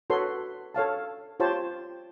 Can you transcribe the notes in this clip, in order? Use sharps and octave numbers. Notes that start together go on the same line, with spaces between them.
F#4 A4 B4 C#5 C6
A4 C#5 F5 A5
F4 G4 C5 C#5 A5